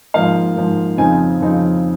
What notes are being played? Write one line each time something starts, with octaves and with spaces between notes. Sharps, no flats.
G#2 F3 A#3 F5
G#2 F3 A#3
F2 C#3 F3 C4 D#4 G#5
F2 C#3 F3 C4 D#4